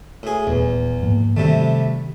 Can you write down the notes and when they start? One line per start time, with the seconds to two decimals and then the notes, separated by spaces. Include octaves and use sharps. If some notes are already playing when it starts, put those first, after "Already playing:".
0.23 A2 G#4
0.47 D#1 E2
1.01 G#2 F3 A#3
1.37 C3 D#3 G3 A3